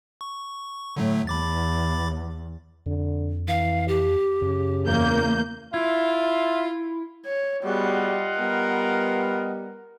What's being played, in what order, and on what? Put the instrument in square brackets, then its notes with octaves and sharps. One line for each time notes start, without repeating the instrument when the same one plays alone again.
[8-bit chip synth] C#6
[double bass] A2 [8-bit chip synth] D3 F#3 A3
[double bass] E2 [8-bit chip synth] B5 D6 A6
[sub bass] F2 [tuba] D3
[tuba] E3 [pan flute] F5
[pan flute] G4
[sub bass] F#2 [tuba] C#3
[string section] E2 A#3 G6
[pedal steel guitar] E4 [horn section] F4 [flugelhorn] E5
[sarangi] C#5
[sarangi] G3 [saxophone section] B3 F#4 G#4 [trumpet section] F4 D#5 F#5
[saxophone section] G3 B3 [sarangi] A#4